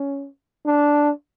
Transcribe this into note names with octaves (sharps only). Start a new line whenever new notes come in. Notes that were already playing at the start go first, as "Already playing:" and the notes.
Already playing: C#4
D4